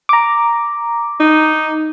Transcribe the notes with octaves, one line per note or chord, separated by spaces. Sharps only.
A#5 D6
D#4